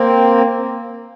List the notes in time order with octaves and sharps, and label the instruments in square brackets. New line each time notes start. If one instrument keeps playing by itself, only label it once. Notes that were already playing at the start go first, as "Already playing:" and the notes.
Already playing: [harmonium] A#3 C4